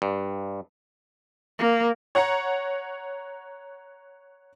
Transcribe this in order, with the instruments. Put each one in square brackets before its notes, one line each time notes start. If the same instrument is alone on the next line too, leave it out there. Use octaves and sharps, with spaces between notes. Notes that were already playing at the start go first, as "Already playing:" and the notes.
[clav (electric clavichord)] G2
[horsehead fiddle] A#3
[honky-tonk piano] C#5 F#5 A#5 C#7